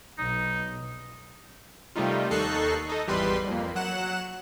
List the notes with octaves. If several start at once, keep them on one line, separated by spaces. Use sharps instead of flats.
B1 D#4
C3 D#3 G3 A3 D#4 F4
D#2 D#4 A4 C#6 F#6 C7
D#4 A4
G#1 E2 G3 B4 B5 C6
F2 A#3
F#3 F#5 F#6 E7